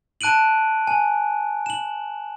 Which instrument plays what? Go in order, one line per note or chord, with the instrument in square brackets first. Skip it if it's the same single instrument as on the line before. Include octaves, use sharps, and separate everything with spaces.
[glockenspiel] A5 F#6 D7 D#7 F#7
G#5
E7 F#7